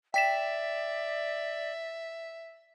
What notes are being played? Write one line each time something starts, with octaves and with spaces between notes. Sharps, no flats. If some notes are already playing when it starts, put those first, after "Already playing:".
D5 E5 G5 B6 E7